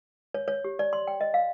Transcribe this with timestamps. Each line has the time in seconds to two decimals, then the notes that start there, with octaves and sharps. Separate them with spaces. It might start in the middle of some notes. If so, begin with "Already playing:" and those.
0.34 C#5
0.48 C#5
0.64 G4
0.79 D5
0.93 C6
1.07 G5
1.21 D#5
1.34 F5